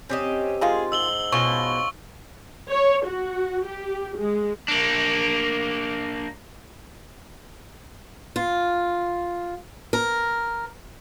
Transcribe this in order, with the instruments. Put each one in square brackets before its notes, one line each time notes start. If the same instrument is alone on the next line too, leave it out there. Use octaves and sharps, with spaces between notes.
[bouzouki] C4 G4 D#5 [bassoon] C#4
[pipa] D#3 G#3 F4 [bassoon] G#4
[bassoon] G#2 [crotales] E6 F#7 G7
[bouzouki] B2 [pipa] C#4 F4 [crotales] C#6 G7
[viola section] C#5
F#4
G4
G#3
[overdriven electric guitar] A#3 D4
[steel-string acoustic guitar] F4
A#4